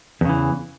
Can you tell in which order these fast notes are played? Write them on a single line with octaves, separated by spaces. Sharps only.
E2 C#3 E3